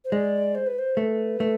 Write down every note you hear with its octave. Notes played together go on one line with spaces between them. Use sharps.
C5
G#3 D5
C5
B4
C5
A3 B4
A3